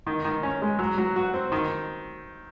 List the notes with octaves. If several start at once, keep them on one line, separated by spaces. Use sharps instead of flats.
D#3
D#3
C#4
G#3
F#3
F#3
F#4
C4
D#3